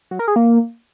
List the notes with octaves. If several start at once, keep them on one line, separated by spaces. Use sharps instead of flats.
F#3
A#4
G#4
A#3